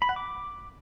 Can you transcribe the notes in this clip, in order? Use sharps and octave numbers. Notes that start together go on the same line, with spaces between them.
B5
F#5
D6